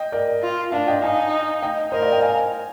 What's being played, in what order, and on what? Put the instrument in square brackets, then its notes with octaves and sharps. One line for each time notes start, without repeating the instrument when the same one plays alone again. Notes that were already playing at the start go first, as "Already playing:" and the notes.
Already playing: [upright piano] D#5 G5
A#4 D5
[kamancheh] F4
[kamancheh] D4 [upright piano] D5 F5
[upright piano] D#5 G5
[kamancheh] D#4 [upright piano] F5 G#5
[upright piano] D#5 G5
[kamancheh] A#4 [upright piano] C5 D#5
[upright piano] D5 F5
D#5 G5
F5 G#5